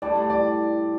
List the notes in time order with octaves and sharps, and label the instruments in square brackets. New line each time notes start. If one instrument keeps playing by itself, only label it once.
[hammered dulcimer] A2 G3 D4 [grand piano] D5
[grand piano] D5